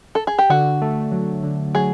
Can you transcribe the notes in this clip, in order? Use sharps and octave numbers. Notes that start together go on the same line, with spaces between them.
A4
G#4
G4
D3 F#4
A3
F#3
D3
F#3 G#4